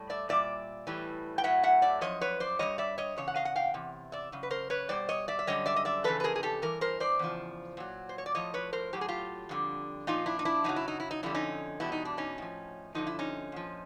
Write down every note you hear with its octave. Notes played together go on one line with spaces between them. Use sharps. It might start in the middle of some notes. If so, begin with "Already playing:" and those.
Already playing: A2 G3
D5 E5
A#2 G3 D5 E5
A2 E3 G3
G5
A2 F#3 E5 F#5
E5 F#5
D5 E5
F#2 C#3 F3 C#5 D#5
B4 C#5
C5 D5
G2 E3 G3 C#5 D#5
D5 E5
C#5 D#5
E2 C#3 C#5
F#5
D#5 F5
F#5
F5 G5
E2 C3
D5 E5
F#2 C#3
B4
A#4 C5
B4 C#5
B2 G3 C5 D5
C#5 D#5
D5 E5
E5
F#2 D3 G3 C#5 D#5
D5 E5
D#5
D5 E5
F2 C#3 E3 A4 B4
B4
G#4 A#4
G#4
G4 A4
G2 E3 A#4
A#4 C5
C5 D5
E2 C#3 F3
A#2 F#3
C5
C#5
D5
A2 F3 C#5 D#5
B4 C#5
A#4 C5
A2 F#3 G4
G#4
F4 G4
F2 D3 G3
A#2 F3 D#4 F4
D4 E4
D#4
D4 E4
F#2 C#3 F#3 D#4
E4
D#4
E4
D#4
F2 D3 G3 E4
C#4 D#4
E2 B2 G3 E4
D#4
D4
C#4 D#4
A2 F3
G2 D3 F3 D#4
E4
C#4 D#4
A#2 F3